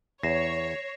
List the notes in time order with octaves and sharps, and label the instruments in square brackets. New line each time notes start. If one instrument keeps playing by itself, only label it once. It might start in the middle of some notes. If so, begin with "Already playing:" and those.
[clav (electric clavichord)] E2 [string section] C#5 [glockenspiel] A#6 C7 E7